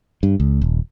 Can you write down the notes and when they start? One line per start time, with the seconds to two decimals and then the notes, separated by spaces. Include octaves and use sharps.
0.23 G2
0.40 C#2
0.62 D#1